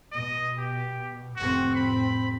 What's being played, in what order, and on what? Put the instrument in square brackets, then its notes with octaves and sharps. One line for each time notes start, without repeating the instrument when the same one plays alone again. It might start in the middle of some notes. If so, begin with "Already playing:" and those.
[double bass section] B2 [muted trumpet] D#5
[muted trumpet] G4
[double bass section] F1 A2 C4 [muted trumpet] F#4
[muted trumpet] B5